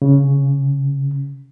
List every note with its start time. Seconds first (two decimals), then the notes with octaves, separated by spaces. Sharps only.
0.02 C#3